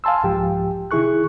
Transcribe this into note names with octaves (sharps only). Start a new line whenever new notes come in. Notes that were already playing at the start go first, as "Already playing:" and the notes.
F5 G#5 A5 C6 E6
C2 G#2 F3 G4 G5
C3 D#3 E4 G#4 C#6 F#6